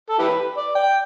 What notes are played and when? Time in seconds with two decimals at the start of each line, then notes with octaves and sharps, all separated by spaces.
0.10 A4
0.19 E4 G4 B4
0.57 D5
0.75 G5